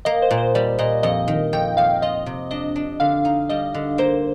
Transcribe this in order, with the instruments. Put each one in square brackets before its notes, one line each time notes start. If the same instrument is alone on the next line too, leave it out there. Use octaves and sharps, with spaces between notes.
[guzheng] A#3 [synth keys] D#5
[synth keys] C5
[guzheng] A#2
[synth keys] C5
[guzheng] G3 [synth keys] D5
[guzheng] A#2 [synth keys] D#5
[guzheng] F2 [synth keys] D#5
[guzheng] D#3
[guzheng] F2 [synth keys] G5
[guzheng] F2 [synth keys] F5
[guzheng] F4 [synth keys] D#5
[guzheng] C3
[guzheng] D4 [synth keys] D#5
[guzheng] D4
[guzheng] D3 [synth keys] F5
[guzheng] D#4
[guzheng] G3 [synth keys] D#5
[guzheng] D3
[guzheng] A#3 [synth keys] C5